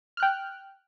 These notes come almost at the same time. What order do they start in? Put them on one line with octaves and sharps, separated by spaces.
F6 F#6 G5